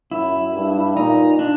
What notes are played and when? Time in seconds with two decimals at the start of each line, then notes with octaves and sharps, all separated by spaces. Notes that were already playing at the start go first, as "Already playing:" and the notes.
0.11 F#2 E4
0.54 G2
0.97 A#2 D#4
1.39 D4